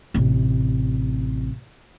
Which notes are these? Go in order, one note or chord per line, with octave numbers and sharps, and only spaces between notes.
A1 C3